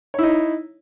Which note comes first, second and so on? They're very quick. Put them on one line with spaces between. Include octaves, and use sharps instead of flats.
C#5 E4 D#4